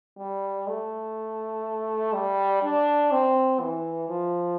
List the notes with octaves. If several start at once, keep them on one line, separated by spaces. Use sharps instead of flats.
G3
A3
G3
D4
C4
E3
F3